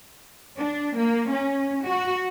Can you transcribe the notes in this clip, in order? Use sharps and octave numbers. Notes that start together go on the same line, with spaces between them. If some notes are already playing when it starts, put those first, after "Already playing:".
D4
A#3
C#4
F#4